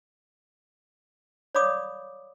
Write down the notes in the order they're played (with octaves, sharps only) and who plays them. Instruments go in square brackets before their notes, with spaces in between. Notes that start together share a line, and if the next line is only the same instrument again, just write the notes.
[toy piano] C#5 D5 F5 B5 D6 D#6